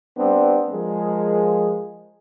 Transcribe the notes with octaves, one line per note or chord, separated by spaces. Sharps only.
G3 B3 C4 D4
F3 G#3 G#4 A#4